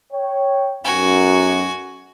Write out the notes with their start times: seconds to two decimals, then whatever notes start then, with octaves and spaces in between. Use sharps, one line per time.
0.13 C#5 G5
0.84 B1 F#2 F#4 G#5